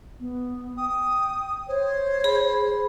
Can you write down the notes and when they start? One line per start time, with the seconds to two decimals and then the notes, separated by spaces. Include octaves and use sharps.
0.20 B3
0.78 G5 D#6
1.68 C5 C#5
2.24 G#4 B5